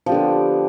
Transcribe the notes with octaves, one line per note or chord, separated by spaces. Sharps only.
D3 F3 B3 G4